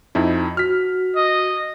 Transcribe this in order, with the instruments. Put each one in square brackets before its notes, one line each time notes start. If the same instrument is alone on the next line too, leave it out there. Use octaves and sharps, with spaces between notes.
[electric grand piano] F2 D#4 E4
[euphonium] F#4 [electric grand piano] F6 B6
[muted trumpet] D#5